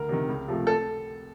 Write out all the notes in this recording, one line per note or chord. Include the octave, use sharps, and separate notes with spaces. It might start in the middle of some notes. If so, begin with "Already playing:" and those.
Already playing: D2 A#4
C3 D#3
C#2
C3 F3 A3
A4